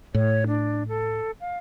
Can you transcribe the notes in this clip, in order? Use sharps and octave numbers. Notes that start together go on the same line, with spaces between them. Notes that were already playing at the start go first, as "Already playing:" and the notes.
A2 C#5
D4
A4
F5